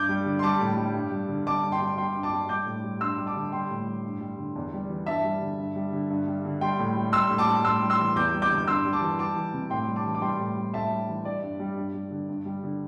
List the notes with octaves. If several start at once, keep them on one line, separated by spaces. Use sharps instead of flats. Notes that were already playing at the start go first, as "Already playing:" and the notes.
Already playing: G2 D6 G6
G3
D3
C6
G3 A5 D6
A2
G3
G2
G3
D3
G3 A5 D6
G2
G5 C6
G3
G3 G5 C6
G2
A5 D6
G3
G3 D6 G6
A2
G3
G2 C6 E6
G3
A5 D6
D3
G3 G5 C6
A2
G3
G2
G3
D3
E2
G3
E3
G2 E5 A5
G3
D3
G2
G3
D3
G2
G3
D3
G3 G5 C6
A2
G3
G3 C6 E6
A2
A5 D6
G3
A2 C6 E6
G3
C6 E6
E3
E2 D6 G6
G3
D6 G6
D3
G2 C6 E6
G3
A5 D6
E3
G3 A5 D6
E3
C3
A2 G5 C6
G3
A5 D6
E3
D6
G3 G5 C6
A2
G3
A2 E5 A5
G3
E3
G3 D5
G2
G3
G2
G3
D3
G2
G3
D3